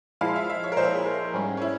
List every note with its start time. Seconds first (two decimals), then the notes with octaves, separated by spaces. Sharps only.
0.21 A#2 F3 G#3 E4 F5
0.36 E5
0.50 E5
0.63 C#5
0.72 A#4
0.77 A#2 F3 G#3 E4 C5
0.94 G#4
1.06 A#4
1.33 G#2 G3 C#4 G#4
1.57 C#4
1.62 E4